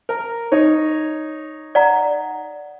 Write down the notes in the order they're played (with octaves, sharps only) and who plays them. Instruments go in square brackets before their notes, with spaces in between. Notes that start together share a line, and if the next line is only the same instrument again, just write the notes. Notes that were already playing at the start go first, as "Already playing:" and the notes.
[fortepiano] A#4
D#4 C#5
[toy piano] D5 F#5 A#5